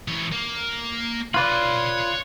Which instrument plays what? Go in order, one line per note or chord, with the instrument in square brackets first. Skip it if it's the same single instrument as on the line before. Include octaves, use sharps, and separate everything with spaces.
[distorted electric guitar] E3 C#5
A#3
[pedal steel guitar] F4 B4 D5 [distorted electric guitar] C#5 B5